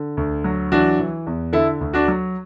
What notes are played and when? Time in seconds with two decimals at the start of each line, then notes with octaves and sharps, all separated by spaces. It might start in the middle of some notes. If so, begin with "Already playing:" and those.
Already playing: D3
0.17 D2
0.44 F#3
0.72 E3 D4 F#4
0.99 E3
1.27 E2
1.53 D3 E4 A4
1.81 D2
1.93 D4 F#4
2.08 F#3